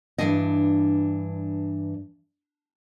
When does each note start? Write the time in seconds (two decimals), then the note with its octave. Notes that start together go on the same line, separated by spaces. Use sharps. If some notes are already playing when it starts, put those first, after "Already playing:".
0.18 G2 E3 F3 G#3 D4 D#5